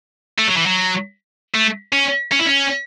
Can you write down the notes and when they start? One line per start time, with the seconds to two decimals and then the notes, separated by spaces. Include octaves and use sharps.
0.38 A3
0.48 F#3
0.57 E3
0.66 F#3
1.55 A3
1.93 C#4
2.32 C#4
2.39 E4
2.46 C#4